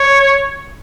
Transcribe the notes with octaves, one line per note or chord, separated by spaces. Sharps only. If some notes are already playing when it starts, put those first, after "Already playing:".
Already playing: C#5